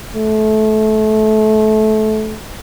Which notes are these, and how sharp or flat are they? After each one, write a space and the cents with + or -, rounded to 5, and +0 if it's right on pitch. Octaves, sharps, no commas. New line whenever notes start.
A3 -25